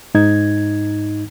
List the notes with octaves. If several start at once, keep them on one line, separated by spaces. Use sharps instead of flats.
G#2 D#4 G#6